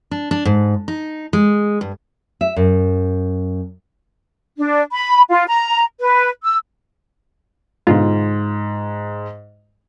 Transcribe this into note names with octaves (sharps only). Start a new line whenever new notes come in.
D4
D4
G#2
D#4
G#3
G2
E5
F#2
D4
B5
F4
A#5
B4
E6
G#2 B2 D3 F4